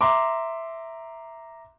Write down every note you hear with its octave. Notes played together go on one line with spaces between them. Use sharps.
E5 A#5 C6 D6